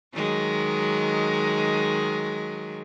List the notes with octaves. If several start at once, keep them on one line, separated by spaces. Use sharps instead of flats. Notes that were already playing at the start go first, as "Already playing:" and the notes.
D#3 F#3 G#3